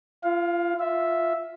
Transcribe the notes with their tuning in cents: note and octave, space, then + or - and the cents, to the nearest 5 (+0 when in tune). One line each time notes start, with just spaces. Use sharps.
F4 -30 F5 +15
F4 +0 E5 +0